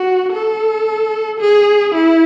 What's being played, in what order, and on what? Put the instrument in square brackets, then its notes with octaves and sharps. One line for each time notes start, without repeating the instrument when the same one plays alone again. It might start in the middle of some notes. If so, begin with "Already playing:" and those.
Already playing: [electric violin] F#4
A4
G#4
E4